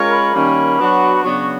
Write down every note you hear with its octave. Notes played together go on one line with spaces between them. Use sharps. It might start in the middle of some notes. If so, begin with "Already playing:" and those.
Already playing: G#3 C#4 F4 A#4 C#5
B5
D#3 G3 A#3 C#4
F#3 B3 D4 F#4
C#3 F#3 B3 D4 F#4 C#6